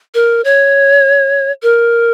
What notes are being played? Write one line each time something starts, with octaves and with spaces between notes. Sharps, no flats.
A#4
C#5
A#4